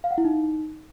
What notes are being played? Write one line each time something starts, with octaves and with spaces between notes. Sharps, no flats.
F5
F#5
E4
D#4